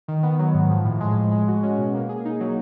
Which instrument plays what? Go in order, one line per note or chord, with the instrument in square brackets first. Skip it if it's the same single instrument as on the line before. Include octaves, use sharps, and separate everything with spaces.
[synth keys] D#3
B3
F#3
G#2
F3
A2
G#3
A2
G#3
F#4
C#4
B2
A#3
G#4
D#4
F#3